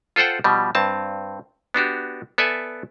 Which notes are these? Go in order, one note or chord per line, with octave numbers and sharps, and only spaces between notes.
F4 A4 C5 F#5 G5
B2 F3 G3
G2 C4 A5
B3 D4 F#4 G4
B3 A4 D5 E5 G#5